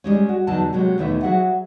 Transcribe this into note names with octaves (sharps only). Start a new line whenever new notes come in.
G3 G#3 C#4
F#4
E2 D3 F#3 D#4 A5
C3 F#3 G#3 A#3
D#2 B2 E3 A3 E4 E5
F#3 F#4 G#4 E5 F#5